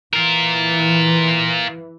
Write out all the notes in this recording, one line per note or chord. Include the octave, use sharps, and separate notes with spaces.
E3 F4 A#4